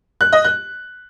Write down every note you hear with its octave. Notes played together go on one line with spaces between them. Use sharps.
F#6
D#5
F#6